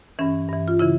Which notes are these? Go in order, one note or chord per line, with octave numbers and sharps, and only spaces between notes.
G2 E3 C#4
G2 E3
F4
C#3 E3 E4